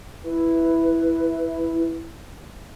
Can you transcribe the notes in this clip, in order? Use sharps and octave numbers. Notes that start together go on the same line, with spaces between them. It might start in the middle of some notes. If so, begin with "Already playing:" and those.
E4 B4